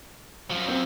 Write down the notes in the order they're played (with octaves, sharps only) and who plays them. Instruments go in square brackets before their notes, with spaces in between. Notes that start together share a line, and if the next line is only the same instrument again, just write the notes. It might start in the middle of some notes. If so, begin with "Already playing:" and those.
[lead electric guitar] F#2 F3
[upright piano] C4